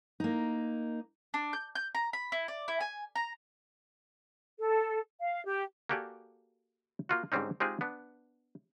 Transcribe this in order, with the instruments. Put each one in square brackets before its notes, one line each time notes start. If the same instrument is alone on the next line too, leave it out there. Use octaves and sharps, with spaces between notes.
[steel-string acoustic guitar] A#3 D#4
[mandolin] D4
G6
G6
A#5
B5
E4
D5
E4
G#5
A#5
[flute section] A4
F5
G4
[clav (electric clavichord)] A#3 F#4 G4 A4 D5 G#5
A#3 F4 F#4
G#2 D3 G3 C4 C#4 D#4
G#3 C4 D#4 F4 G4 G#4
B3 D4